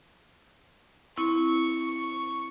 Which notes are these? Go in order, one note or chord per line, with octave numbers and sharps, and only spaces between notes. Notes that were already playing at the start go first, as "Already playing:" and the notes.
C4 E4 C#6